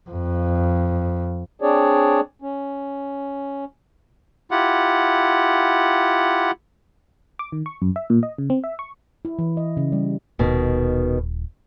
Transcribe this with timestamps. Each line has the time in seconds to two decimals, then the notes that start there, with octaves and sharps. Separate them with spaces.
0.10 F2
1.62 C4 D4 G#4 C#5 D5
2.42 C#4
4.51 E4 F4 G4 F#5
7.39 D6
7.52 D#3
7.66 C#6
7.82 F#2
7.96 E5
8.10 A#2
8.23 D#5
8.38 C#3
8.50 C4
8.64 E5
8.79 C#6
9.25 E4
9.39 E3
9.57 D#5
9.77 C#3
9.92 G3
10.39 D#1 B2 D#3